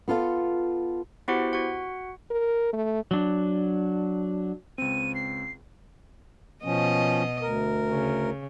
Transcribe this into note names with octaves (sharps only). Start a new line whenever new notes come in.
B3 F4 A4 F5
B3 E4 F#4 G4 C5 F#5
F#4 F#5
A#4
A3
F#3 D4
C#2 C4 D#7
C7
B2 F3 C#4 D#5
D2 A#4
C#3